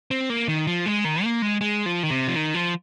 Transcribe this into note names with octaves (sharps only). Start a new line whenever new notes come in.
C4
A#3
D#3
F3
G#3
D#3
A#3
G#3
G#3
F3
D#3
C3
F3
D#3
F3